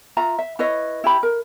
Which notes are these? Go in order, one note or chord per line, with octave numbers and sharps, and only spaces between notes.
F4 E5 A#5
E5
E4 B4 C#5 D#5
E4 G4 B5
A#4